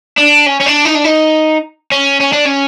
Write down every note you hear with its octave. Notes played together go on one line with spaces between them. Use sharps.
D4
C#4
C#4
D4
D#4
D4
D#4
C#4
C#4
D4
C#4